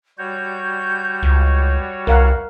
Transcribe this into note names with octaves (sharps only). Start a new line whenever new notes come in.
G3 F#4 C#5 G6
C#2
C2 A#4 F5 F#5